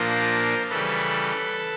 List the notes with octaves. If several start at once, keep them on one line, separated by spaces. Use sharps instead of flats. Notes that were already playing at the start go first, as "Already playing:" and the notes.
Already playing: A#2 F3 A#3 D4 A#4 C5
C#3 E3 G3 A4 B4